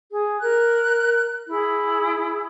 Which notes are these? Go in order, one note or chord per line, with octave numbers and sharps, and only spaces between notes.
G#4
A#4 F#6
E4 G#4